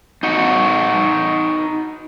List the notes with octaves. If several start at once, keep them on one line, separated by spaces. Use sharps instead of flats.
D#4 F#4